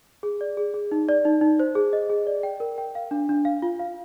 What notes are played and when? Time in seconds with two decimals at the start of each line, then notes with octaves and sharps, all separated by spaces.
0.23 G#4
0.41 D5
0.57 G#4
0.74 G#4
0.92 D#4
1.09 D5
1.25 D#4
1.41 D#4
1.60 C5
1.75 G#4
1.93 D#5
2.10 G#4
2.27 D5
2.43 G5
2.60 A#4
2.78 G5
2.95 F5
3.11 D4
3.29 D4
3.45 F5
3.62 F4
3.80 F5